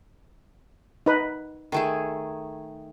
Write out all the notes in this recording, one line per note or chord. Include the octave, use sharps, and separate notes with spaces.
D#4 B4
D#3 A3 G#4